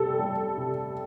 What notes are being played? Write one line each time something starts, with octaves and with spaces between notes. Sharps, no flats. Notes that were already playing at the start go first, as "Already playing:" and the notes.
Already playing: C3 G3 A4
G3
C3